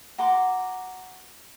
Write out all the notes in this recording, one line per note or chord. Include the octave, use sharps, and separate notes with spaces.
F#4 A#5 C6 D6